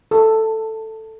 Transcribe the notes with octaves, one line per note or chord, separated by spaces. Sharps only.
A4